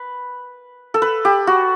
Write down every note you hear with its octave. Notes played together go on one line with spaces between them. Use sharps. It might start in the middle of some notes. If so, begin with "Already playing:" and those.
Already playing: B4
A4
B4
G4
F#4